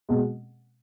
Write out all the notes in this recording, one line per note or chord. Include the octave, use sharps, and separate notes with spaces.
B2 G#3